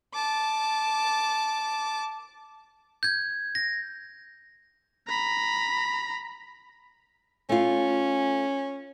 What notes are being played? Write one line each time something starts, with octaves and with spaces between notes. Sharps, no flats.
A5 D6
G6 G#6
A#6
A#5 B5
A3 C#4 F4